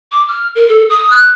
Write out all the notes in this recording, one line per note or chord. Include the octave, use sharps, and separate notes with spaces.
D6
F6
A#4
A4
D#6
F#6